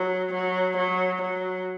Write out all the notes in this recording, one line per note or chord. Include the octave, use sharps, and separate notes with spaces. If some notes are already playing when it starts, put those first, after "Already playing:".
Already playing: F#3
F#3
F#3
F#3